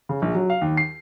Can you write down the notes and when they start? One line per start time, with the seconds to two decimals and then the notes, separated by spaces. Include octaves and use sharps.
0.09 C#3
0.22 A#1
0.35 F#3
0.50 F5
0.61 D#2
0.77 C7